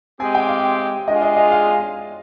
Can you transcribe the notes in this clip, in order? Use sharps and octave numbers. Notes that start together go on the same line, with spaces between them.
G#3 C4 G4 G#5
G5
F5
G#3 D4 F4 G#4 D#5
D#5
D#5
F5